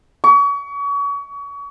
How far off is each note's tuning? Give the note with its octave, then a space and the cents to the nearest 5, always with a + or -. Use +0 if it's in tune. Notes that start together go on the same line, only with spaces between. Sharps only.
C#6 +35